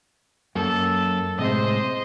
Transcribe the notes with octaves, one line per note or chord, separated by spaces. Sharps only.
F#2 A#3 A4
A2 C3 G#3 C5 D#5